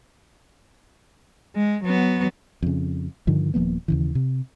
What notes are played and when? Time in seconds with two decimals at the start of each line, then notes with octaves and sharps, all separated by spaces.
1.56 G#3
1.84 F#3 B3
2.63 F2 C#3
3.27 G2 D3 D#3 F3
3.54 D#1 F3 A#3 B3
3.88 D#2 C#3 E3
4.15 C3